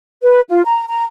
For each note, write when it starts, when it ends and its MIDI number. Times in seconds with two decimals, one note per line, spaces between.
0.23 0.41 71
0.49 0.63 65
0.65 0.85 82
0.88 1.05 82